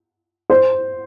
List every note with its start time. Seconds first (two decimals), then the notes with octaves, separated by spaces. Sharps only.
0.50 C5